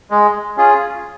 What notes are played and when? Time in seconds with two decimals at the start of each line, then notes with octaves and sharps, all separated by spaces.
0.11 G#3
0.57 C#4 F4 G#4